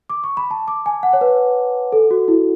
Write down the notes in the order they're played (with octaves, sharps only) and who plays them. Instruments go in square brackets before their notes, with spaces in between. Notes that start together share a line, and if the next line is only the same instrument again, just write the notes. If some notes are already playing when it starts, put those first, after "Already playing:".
[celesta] D6
C#6
B5
A5
D6
G#5
F#5
C#5
B4
A4
F#4
E4